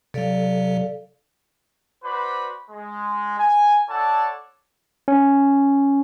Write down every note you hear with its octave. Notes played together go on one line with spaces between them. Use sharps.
C3 F#3 A4 D5 F5
F#4 B4 C5 D5 B5
G#3
G#5
E4 A4 C#5 D5 F#5 A5
C#4